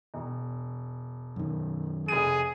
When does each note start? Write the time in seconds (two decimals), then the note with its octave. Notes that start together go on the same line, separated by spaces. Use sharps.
0.14 E1
1.36 F#2 D#3
2.08 F1 G#4 D#7